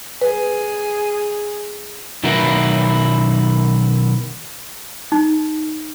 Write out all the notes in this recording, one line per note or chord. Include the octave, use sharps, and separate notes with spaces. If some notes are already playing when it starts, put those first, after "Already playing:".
G#4 B4
B1 D#3 E4 F#4 A#4 B4
D#4